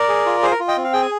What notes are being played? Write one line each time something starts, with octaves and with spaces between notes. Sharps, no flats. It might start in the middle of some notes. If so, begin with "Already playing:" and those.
Already playing: A#4 D5
G#4
F4
G#4 C5
A#4
F4
D#5 G5
C4
F5
G#4 G5
G#5